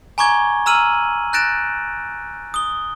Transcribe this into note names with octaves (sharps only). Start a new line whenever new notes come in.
G#5 A#5 C#6 D6 G#6 G7
A#5 E6 F6 D#7 F#7
F#6 G6 A6 A#6 D7 E7
D#6 G7